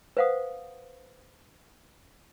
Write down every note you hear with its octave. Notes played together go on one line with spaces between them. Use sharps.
B4 C5 F5 F#5 D#6